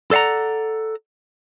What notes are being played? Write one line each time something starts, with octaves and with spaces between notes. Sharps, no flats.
A4 D5 F5 F#5 A#5